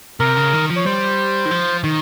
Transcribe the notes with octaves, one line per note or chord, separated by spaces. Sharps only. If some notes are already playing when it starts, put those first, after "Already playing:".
C3 A#4
C#3
D#3
F3
C#5
G3 C5
D#3
F3
D#3